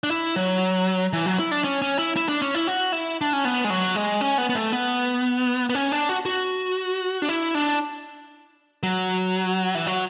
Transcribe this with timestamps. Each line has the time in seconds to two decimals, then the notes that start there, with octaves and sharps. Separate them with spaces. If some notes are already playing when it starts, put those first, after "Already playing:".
0.03 D4
0.11 E4
0.36 F#3
1.13 E3
1.26 F#3
1.39 E4
1.51 D4
1.64 C#4
1.82 C#4
1.99 E4
2.16 E4
2.29 D4
2.42 C#4
2.55 E4
2.67 F#4
2.92 E4
3.21 D4
3.33 C#4
3.45 B3
3.64 G#3
3.70 F#3
3.96 G#3
4.21 C#4
4.38 B3
4.49 B3
4.55 A3
4.72 B3
5.69 B3
5.75 C#4
5.92 D4
6.09 F#4
6.25 F#4
7.22 D4
7.29 E4
7.55 D4
8.83 F#3
9.75 E3
9.86 F#3